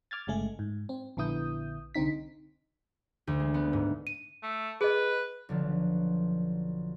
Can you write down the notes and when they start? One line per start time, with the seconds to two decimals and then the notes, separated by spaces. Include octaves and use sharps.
0.11 D6 F6 G#6 A6
0.27 G1 C#3 G#3 A3 G#4
0.59 G#2
0.89 C4
1.17 A#1 D3 B3 E4 D#6 G6
1.95 C2 D3 C4 D#4 B6
3.27 D2
3.40 G#3
3.54 B3
3.73 G#2
4.07 D#7
4.43 A3
4.81 G#4 B4 D#5
5.49 B1 D3 F3